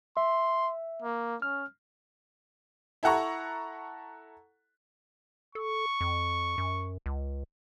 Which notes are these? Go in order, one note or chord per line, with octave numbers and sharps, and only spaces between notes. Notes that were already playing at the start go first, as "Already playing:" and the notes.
E5 C6
A#3
C#4 F6
E4 A4 F#5 A#5 C#6
A4 C#6
F2
F#2
C#2